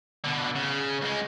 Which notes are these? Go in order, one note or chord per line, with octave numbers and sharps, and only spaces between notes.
B2 D3
C#3
C#2 G#3